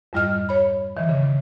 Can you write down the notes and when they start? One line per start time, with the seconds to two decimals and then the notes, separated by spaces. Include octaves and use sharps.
0.13 F2 G#2 G3 F4 D#5 F6
0.49 C#5 B5
0.97 D#3 E3
1.09 C#3